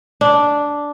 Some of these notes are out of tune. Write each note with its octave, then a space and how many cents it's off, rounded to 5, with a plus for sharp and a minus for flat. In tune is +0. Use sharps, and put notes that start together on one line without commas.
D4 -5